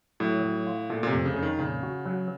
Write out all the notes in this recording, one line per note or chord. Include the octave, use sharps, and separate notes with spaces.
A2 F#3
F#3
F4
A#2 A3
A#2
C3
F2
C#3
F2 C#3
D#3
A#2 C#3
F#4
F#3